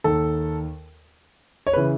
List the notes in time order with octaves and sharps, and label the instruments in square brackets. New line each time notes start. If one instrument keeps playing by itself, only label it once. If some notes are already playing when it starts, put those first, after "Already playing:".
[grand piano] D#2 D#3 A4
C#5
C#3 E3 B4